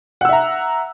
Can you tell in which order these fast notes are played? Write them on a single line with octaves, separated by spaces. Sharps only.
F#5 E6 E5 A#5